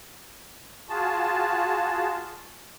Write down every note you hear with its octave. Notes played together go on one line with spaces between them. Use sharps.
F4 F#4 G#4 A5